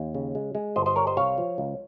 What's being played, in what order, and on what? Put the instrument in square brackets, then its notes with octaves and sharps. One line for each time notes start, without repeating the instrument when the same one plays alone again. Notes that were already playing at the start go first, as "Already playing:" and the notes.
Already playing: [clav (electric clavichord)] D#2
C#3
G#3
G#3
G1 C5 D#5
C5 D#5
G3 A#4 C#5
C5 D#5
C2 C#5 F5
F3
C#2